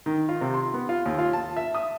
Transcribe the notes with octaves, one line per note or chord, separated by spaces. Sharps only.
D#3
F4
C3
C6
B3
F4
D#2
F4
A5
E5
D#6